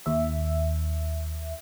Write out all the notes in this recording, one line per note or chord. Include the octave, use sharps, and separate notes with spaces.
D#2 E5